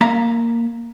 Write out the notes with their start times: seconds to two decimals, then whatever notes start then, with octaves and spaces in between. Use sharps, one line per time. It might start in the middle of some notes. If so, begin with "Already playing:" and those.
0.01 A#3 E5 F5 A#5